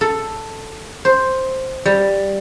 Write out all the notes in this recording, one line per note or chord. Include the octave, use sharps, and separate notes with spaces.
A4
C5
G3